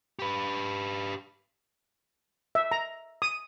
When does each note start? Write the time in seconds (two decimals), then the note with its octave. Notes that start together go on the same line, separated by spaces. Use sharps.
0.19 G4 B4
2.55 E5
2.72 A#5
3.22 D#6